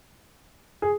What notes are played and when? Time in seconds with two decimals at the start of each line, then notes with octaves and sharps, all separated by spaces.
0.82 G#4